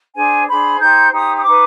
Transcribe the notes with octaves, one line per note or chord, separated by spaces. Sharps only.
D4 G#4 C5 G#5
D4 G#4 C5 B5
D#4 G4 C5 G6
D#4 G4 C5 D#6
D#6
D#4 B4 D6